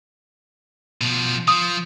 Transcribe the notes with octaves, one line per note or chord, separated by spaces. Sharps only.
B2 F3
F3 D#6